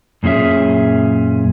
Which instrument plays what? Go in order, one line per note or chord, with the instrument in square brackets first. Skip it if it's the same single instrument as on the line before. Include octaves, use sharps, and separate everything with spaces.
[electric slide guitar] F#2 A#2 C#4 G#4 E5